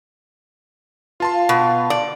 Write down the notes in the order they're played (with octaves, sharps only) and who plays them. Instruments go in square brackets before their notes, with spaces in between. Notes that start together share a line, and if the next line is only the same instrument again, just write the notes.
[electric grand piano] F4 A5 C6 [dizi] B4
[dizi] F5
[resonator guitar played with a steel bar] B2
D5